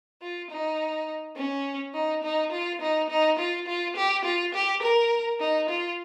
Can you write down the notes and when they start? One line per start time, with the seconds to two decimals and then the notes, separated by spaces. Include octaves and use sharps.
0.22 F4
0.51 D#4
1.36 C#4
1.94 D#4
2.24 D#4
2.52 F4
2.81 D#4
3.10 D#4
3.39 F4
3.67 F4
3.96 G4
4.25 F4
4.54 G4
4.82 A#4
5.40 D#4
5.69 F4